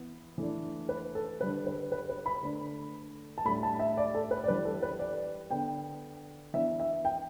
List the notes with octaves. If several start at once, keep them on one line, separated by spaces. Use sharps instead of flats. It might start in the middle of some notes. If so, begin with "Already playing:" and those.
Already playing: E3 B3
E3 A3 D4
B4
A4
D3 G3 D4 B4
B4
B4
B4
B5
D3 A3 D4
A5
A2 G3 D4 B5
A5
E5
D5
A4
B4
D5
E3 G3 D4 B4
A4
B4
D5
D3 B3 D4 G5
E3 B3 D4 E5
E5
G5